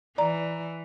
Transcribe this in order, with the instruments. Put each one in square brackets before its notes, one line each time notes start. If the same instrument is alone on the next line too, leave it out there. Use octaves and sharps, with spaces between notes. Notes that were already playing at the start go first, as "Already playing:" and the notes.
[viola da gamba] E3 [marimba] D5 A#5